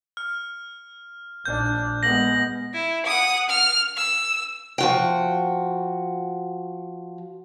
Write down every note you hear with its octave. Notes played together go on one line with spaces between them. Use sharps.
F6
A#1 D4 G6
G#3 B3 A#6 F#7
E4
F#5 D#6
F6
E6
F3 F#4 G5